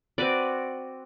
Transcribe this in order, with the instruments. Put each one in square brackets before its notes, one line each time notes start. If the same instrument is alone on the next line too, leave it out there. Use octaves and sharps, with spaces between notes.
[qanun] C4 F#4 B4 D5